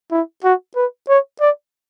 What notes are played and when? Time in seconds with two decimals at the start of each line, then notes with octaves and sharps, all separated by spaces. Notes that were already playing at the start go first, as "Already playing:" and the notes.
0.12 E4
0.44 F#4
0.76 B4
1.09 C#5
1.41 D5